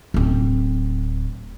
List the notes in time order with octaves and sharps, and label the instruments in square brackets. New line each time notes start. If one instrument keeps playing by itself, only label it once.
[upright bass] D1 C4